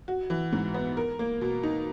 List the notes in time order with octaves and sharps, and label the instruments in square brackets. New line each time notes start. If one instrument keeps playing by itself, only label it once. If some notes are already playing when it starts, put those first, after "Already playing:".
[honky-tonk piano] F#4
E3
G#2
B3
A#4
A#3
B2
D#4